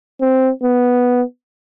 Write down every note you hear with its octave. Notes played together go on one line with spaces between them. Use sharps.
C4
B3